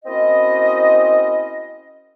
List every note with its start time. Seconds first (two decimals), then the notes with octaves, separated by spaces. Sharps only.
0.05 A#3 C4 C#4 E4 F#4 D#5